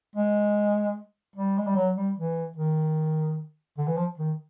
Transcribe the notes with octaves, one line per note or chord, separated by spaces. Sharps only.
G#3
G3
G#3
G3
F#3
G3
E3
D#3
D3
E3
F3
D#3